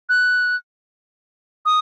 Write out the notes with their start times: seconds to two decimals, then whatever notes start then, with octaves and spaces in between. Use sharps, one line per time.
0.09 F#6
1.66 D#6